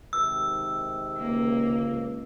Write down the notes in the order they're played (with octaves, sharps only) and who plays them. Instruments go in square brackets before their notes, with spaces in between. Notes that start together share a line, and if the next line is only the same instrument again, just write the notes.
[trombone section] G#2 C3 D#3 [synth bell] E6
[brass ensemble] C#2 [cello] A#3